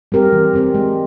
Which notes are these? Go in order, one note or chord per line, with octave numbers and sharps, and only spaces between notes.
G3 C4 G4 A#4
E3
G3 C4 G4 A#4
G#3